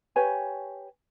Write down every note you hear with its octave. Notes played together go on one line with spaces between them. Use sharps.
G4 B4 C#5 G#5